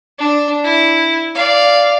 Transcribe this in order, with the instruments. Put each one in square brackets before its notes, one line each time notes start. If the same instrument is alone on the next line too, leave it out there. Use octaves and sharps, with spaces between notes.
[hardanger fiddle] D4
E4
D5 F5